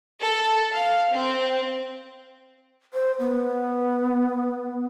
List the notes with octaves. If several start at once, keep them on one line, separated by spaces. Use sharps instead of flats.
A4
F5
C4
C5
B3